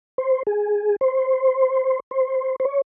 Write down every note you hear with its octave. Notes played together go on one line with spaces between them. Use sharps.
C5
G#4
C5
C5
C5
C#5